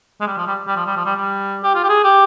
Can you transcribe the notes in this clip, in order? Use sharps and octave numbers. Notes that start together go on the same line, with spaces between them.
G#3
G3
F3
G3
G3
F3
G3
F3
G3
G3
G4
F4
G4
G#4
G4